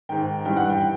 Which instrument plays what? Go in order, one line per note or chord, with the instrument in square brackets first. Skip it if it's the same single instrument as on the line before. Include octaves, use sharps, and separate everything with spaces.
[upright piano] G#2 D#3 G5
G2 E3 G5
F#5
G5
G5